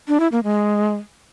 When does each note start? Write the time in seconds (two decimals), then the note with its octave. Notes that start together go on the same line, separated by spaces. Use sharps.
0.08 D4
0.20 E4
0.32 A#3
0.44 G#3